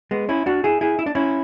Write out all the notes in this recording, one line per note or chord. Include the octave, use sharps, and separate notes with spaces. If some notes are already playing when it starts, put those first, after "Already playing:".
G#3 B3
C#4 E4
D4 F#4
E4 G#4
E4 G#4
E4
D4
C#4 E4